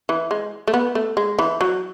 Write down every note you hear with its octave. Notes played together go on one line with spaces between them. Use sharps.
E3
G#3
A3
B3
A3
G#3
E3
F#3